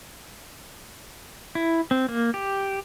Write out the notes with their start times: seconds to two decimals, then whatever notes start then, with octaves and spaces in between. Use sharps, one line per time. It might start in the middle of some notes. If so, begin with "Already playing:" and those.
1.55 E4
1.91 C4
2.09 A#3
2.34 G4